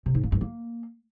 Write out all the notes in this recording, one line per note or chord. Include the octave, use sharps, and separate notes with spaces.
C3
G#2
A#3
G2
A#3